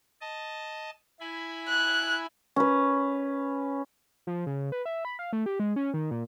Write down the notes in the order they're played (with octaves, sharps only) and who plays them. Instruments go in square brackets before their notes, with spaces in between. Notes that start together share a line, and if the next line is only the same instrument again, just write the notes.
[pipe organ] D#5 A5
E4 G#5 B5
[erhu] F#6
[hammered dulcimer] C#4 B4
[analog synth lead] F3
C#3
B4
E5
B5
F5
A3
G4
G#3
C#4
D#3
A#2